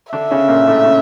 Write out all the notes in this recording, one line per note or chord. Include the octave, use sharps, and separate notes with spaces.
D3 D4 E5
C#3 C#4
A#2 A#3
A2 A3
C#3 C#4